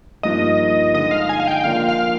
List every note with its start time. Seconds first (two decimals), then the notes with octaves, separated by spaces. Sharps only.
0.23 G2 F3 A#3 D#4 D#5
0.94 D3 G#3 D#4 D#5
1.11 F5
1.29 G#5
1.40 F5
1.47 G5
1.64 D3 F3 A#3 D4 F4 F5
1.88 F5